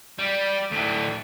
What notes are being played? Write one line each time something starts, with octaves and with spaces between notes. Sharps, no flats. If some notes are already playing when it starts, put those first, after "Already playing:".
G3
D2 A2